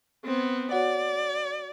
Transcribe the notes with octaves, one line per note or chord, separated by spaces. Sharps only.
B3 C4
F#4 C#5 D5 F#5